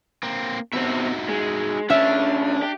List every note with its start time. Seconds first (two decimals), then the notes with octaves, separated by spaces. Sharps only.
0.23 A#3 C4
0.73 B2 C4 D#4 F#4 E5
1.29 G#3
1.90 D2 C#4 D4 E5
2.63 G4